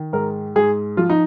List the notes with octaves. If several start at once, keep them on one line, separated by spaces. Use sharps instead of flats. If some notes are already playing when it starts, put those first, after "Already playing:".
Already playing: D#3
G#2 A#4
G#2 G#4
F3 F4
D#4